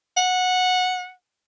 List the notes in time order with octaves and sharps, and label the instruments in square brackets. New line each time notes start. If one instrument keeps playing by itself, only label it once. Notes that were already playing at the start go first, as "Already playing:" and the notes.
[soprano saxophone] F#5